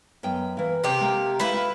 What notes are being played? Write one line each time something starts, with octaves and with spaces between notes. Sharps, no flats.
F#2 B3 G5
E3 A#3
C3 G4
A3 A#3
A3 E4 B4 F5
F4